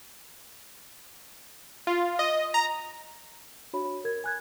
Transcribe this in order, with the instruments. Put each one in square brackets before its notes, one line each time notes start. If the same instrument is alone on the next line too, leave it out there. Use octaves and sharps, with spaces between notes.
[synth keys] F4
D#5
A#5
[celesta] D4 F#4 C#5 E5 B5
A#4 G#6
G#5 F#6 G#6